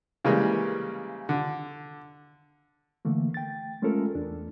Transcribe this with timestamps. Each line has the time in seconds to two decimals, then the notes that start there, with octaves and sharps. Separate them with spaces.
0.25 C#3 E3 G3 G#3 A#3
1.29 D3
3.05 D3 E3 A3 A#3
3.34 G5 A6
3.82 G#3 A3 C#4 F4 A4 A#4
4.15 E2 D4